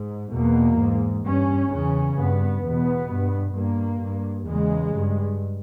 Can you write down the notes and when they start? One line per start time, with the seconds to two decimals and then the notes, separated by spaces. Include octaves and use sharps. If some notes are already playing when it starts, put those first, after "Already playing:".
Already playing: G#2
0.32 E2 B2 A#3
0.78 G#2
1.25 G2 C#4
1.71 E2 C#3 C#4
2.17 G2 B3
2.64 E2 B2 B3
3.10 G2
3.56 G2 A#3
4.02 G2
4.48 E2 C#3 G#3
4.94 G2